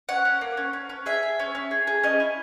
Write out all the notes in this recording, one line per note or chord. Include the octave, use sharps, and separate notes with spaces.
C#4 F#5
C#4
A#3
C#4
C#4
C#4
G#4 E5
G#4
C#4
C#4
G#4
G#4
C#4 D#5
E4